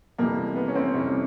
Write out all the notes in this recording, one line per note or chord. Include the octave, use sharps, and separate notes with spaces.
F2 C3 E3 G3 A#3
B3
C#4
C4
F2 C3 E3 G3 C#4